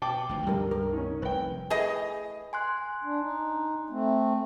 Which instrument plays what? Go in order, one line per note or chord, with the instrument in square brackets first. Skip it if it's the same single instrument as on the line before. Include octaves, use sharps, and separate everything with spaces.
[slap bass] B2 [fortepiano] G5 A5 D6
[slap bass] G#1 D2 F3
[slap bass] C#2 G2 C3 [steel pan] G3 A#4
[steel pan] A#4
[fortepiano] D#3 C#4
[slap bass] F1 C2 [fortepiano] B4 G5
[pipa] E3 A3 G#4 D#5
[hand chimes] G#5 C6 F#6
[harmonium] D4
D#4
A3 C4